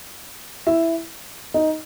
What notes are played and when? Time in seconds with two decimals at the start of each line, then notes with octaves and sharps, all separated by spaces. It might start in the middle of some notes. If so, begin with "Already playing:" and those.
0.67 E4 E5
1.54 D#4 D#5